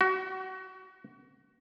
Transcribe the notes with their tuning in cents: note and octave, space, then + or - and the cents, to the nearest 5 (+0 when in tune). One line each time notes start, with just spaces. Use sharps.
F#4 +30